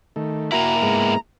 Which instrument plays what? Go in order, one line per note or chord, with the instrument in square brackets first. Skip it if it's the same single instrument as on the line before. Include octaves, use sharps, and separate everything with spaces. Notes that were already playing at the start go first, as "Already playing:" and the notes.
[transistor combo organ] D#3 A3
[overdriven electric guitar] A#3 E4 [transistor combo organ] F#4 A#4 [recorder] A#5
[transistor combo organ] G#2 G#3 B3